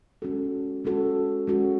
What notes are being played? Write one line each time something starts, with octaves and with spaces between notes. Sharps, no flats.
G#3 C#4 F#4 A4
G#3 C#4 F#4 A4
G#3 C#4 F#4 A4